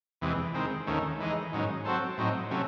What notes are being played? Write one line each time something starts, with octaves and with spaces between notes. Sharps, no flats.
E2 C3 E3 G#3
D#3 G#3 C4
D#2 D#3 A3 C#4
E3 G#3 D#4
G#2 D#3 F#3 C#4
F#3 C4 F#4 A4 C5
A2 F#3 C4 D#4
C3 F#3 A3 C#4